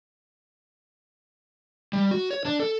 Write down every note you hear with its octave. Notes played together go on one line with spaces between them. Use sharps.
G3
F#4
C#5
D4
A4